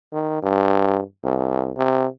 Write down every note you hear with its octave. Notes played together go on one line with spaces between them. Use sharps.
D#3
G2
C2
C3